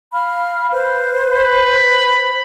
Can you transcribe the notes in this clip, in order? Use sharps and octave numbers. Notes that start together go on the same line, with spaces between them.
F5 B5 F6
B4 C5
B5